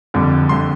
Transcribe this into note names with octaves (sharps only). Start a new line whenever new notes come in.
F#1 F2 D3 G3
D3 G3 C6